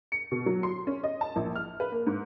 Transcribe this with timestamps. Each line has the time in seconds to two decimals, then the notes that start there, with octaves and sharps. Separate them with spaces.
0.12 C#7
0.32 B2
0.46 F#3
0.63 C6
0.87 C#4
1.04 D#5
1.21 A5
1.36 A#1
1.56 F6
1.80 B4
1.92 A#3
2.07 G#2